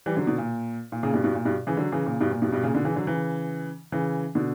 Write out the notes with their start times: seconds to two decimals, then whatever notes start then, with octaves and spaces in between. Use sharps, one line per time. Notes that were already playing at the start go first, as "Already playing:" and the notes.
0.06 E3 G3
0.17 D3 F#3
0.27 B2 D3
0.38 A#2
0.92 A#2
1.03 A#2 C#3
1.13 G2 B2
1.24 G2 B2
1.35 A#2
1.45 G2 B2
1.67 C#3 E3
1.77 D3 F#3
1.92 C#3 E3
2.06 A#2 C#3
2.21 G2 B2
2.31 A#2
2.42 G2 B2
2.53 G2 B2
2.63 A#2 C#3
2.75 B2 D3
2.85 C#3 E3
2.95 D3 F#3
3.07 C#3 E3
3.92 C#3 E3
4.35 B2 D3